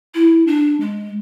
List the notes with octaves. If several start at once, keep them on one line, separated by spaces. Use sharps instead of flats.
E4
D4
G#3